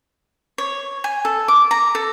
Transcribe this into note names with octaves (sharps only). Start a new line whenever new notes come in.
C#5
G#5
A4
D6
A#5
A4